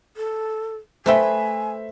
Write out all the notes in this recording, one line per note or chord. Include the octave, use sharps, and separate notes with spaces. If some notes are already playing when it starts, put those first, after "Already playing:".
A4
A3 B4 C5 E5 G5 G#5